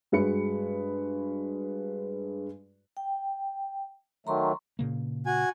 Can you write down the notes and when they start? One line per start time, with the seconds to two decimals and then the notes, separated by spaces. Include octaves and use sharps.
0.12 G2 G#3 F#4 B4 B5 C#7
2.97 G5
4.27 D#3 F#3 A3 A#5 C6 C#6
4.79 A#2 C#3 A#3
5.26 F#4 G#5